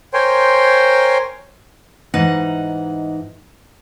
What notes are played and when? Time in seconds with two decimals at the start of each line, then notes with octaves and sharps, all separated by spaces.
0.14 A#4 C5 C#5 G5 G#5 C6
2.14 G#2 E3 D#4 F#5